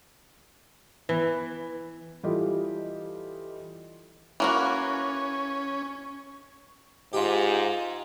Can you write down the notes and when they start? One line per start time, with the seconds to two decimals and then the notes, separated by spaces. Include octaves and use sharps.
1.09 E3 B3 B4
2.23 E3 G3 F4 G4 A4 D#5
4.40 E3 A#3 C#4 F#4
7.13 G#2 F4 G4